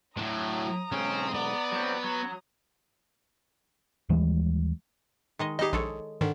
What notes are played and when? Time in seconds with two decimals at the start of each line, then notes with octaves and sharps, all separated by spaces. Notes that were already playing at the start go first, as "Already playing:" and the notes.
0.17 A2 F#3 D4 A#5 D#6
0.92 B1 G#2 C4 C#4
1.34 B3 D5
1.72 F#3 C4
2.04 F#3
4.09 D#2 E3 G3 G#3
5.39 D#3 G#3 D#5
5.59 G3 D#4 G4 G#4 D#5
5.73 A#1 G#3 A4 C#5
6.21 G#2 D3 D#3